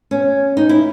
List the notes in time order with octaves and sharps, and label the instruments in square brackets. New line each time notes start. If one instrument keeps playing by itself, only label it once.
[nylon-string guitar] C#4
D#4
E4